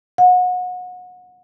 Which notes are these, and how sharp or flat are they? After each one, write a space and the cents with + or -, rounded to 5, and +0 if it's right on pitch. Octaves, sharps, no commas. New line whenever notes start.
F#5 -30